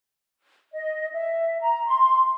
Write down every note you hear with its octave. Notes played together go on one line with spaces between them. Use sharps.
D#5
E5
A#5
C6